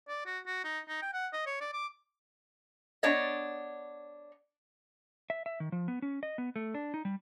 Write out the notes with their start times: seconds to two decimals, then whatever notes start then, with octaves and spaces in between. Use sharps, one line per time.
0.08 D5
0.26 F#4
0.47 F#4
0.64 D#4
0.88 D#4
1.02 G5
1.14 F#5
1.33 D#5
1.46 C#5
1.61 D5
1.73 D6
3.03 B3 D4 C#5 D#5
5.30 E5
5.46 E5
5.60 D#3
5.72 F3
5.88 B3
6.02 C#4
6.23 D#5
6.38 B3
6.56 A3
6.75 D4
6.94 D#4
7.05 G3